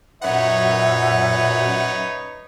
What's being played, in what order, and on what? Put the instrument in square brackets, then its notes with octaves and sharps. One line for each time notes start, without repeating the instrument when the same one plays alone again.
[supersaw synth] F#2 F#5 [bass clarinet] A#2 [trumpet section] D#4 B4 C#5 [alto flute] E5